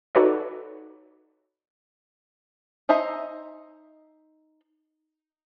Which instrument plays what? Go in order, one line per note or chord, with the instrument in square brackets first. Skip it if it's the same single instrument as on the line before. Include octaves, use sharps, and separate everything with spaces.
[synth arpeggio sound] D#4 F#4 A4 B4 C#5 D5
[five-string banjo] D#4 C5 D#5 E5 A#5